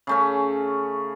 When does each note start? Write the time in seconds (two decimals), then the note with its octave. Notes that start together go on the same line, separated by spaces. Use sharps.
0.07 C#3 A3 C#4